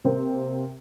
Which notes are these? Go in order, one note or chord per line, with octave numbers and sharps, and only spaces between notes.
C3 A#3 C4